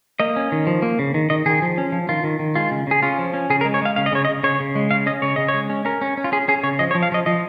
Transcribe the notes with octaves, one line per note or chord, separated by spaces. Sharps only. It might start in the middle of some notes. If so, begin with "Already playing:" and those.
A#3 D#5
C#4
D#3
F3
A#3
C#3
D#3
D#3 D#5
D#3 G#4
F3
C#4
F3
D#3 F4
D#3
D#3
G#3 F4
C#3
C#3 G#4
C#4 F4
F3
C#4
C#3 G#4
A#4
G#3
C#5
G#3 F5
C#3 F5
D#5
C#3 C#5
D#5
C#3
C#3 C#5
C#3
G#3
C#3 F5
C#4 D#5
C#3 C#5
C#3 D#5
C#5
G#3
C#4
C#4 A#4
C#4
C#4
F4
C#4 G#4
C#4 G#4
C#3 C#5
F3 D#5
C#5
F3
F5
F3 D#5
F3 D#5